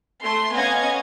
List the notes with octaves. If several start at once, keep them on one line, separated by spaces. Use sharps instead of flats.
A3 C6
B3 C#4 D#5 F5 G#5 G#6